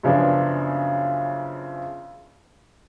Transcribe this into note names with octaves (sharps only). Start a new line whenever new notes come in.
F#2 C#3 F3 B3 D4